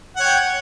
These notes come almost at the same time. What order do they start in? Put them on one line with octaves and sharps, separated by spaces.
F#5 C#5 G5